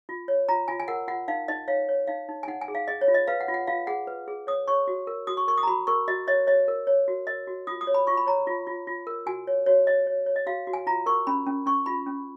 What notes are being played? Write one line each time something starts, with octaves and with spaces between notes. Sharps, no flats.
F4
C#5
F4 A#5
F4 G#5
G#5
A#4 F#5
F4 F#5
D#4 F5
D#4 D#5
C#5 F5
C#5
D#4 F5
D#4
G#5
D#4 F#5
G#5
G#4
F5
G#4 D#5
C#5
F4
D#5
B4 F5
F#5
F4
F#5
F4 F5
G#4 F#5
B4
G#4
C#5 D#6
C#5 C#6
F#4
A#4
F#4 D#6
C#6
A#4 C#6
D#6
A#5
F#4 B5
A#4 C#6
F#4 D#5
C#5 D#5
C#5 D#5
A#4
C#5
F#4
A#4 D#5
F#4
F4 D#6
D#6
C#5
B5
F4 C#6
B5
C#5 A#5
F4
F4
F4
A#4
F#4 G#5
C#5
F#4 C#5
C#5 D#5
C#5
C#5
D#5
F#4 F5
F#4
G#5
F4 A#5
A#4 C#6
C#4 B5
C#4
C#4 C#6
F4 B5
C#4